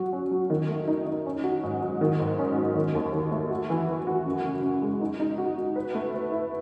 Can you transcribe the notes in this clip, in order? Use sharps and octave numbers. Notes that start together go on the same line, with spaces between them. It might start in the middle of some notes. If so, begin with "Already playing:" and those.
Already playing: F#3 F#4
C#4
F#3
D#3
A3
D#4
D#4
C#4
F#4
G#2
F#3
D#3
G#2
C#4
F#3
D#3
D#2
D#3
A3
F#4
E3
E3
F#4
F#2
C#3
C#3
G#3
D#4
D#4
F#4
F#4
B4
A3
B4
E4